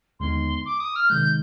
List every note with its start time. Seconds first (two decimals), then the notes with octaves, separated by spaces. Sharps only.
0.19 D#2 D3 G#3 B3 D#4 C6
0.65 D6
0.80 D#6
0.95 F6
1.10 C3 D#3 G#3 G6